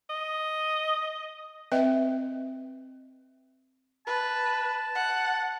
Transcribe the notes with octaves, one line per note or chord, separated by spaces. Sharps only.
D#5
C4 B4 D#5 E5 G5
B4 A5
F#5